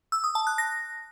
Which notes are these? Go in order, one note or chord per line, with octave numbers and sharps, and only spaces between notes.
E6
D#6
A5
F#6
A#6